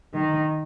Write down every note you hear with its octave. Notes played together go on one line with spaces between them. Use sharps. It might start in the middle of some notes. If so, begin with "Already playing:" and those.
D#3